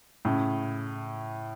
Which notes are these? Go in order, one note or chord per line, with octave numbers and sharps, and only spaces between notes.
A2 C#3